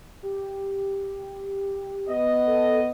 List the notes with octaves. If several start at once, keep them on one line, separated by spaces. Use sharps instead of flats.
G4
B3 D#5
A4